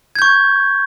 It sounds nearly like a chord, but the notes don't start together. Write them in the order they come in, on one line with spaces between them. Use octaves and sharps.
G#6 G6 C#6